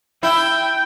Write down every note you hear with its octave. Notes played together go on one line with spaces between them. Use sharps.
E4 G5